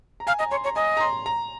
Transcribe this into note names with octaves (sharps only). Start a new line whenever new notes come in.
A#5
F5 G#5
D#5 A#5
C#5 C6
C#5 A#5
D#5 G#5
A#5
C6
A#5